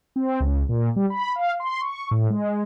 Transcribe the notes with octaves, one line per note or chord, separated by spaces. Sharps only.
C4
C#2
A#2
G3
B5
F5
C6
C#6
A2
G#3